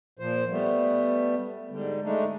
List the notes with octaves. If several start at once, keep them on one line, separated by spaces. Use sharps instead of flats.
A#2 F3 C5
G3 A3 B3
G#2 D3 G3
G#3 A3 D4 D#4